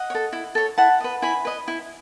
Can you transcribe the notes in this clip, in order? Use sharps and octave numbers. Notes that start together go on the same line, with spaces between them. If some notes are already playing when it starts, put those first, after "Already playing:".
Already playing: D#5 F#5
C#5
A4
E4
A4 C#5
E4 F#5 A5
B4 D#5
E4 G#5 B5
B4 D#5
E4